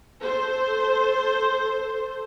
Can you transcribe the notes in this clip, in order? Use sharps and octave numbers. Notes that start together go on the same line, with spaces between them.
A4 C5